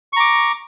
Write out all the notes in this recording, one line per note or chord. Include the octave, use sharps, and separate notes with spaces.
A#5 C#6 D6